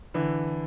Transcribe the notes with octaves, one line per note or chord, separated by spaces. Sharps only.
D3 E3